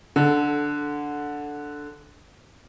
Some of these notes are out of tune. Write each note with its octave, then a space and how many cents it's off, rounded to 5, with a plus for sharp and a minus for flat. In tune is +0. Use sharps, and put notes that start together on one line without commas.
D3 +0 A4 -15